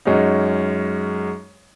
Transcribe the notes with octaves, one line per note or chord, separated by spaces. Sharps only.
F#2 G#3 C#4 D#4